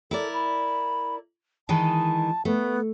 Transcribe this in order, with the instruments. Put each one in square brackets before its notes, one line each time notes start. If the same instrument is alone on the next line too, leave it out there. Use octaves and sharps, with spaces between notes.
[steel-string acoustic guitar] E4 A#4 D5 [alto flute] A4
[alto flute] B5
[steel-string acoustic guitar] D#3 E3 G#3 [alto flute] A5
[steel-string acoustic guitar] A3 [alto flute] B3